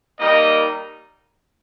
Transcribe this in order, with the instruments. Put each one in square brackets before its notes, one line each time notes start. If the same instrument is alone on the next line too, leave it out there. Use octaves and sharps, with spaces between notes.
[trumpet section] G3 A#3 D#4 A#4 D#5